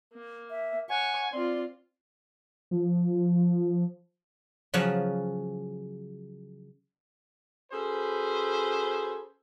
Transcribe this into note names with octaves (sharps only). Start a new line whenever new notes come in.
A#3
E5
C#5 F#5 G#5 C#6
C4 F4 D5 C6
F3
C#3 F3 F#3 F#4 G#4
C#4 F#4 G#4 A4 B4 C5